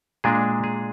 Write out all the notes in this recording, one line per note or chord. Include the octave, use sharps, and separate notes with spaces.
A#2 G#3 D4 G#4
G#4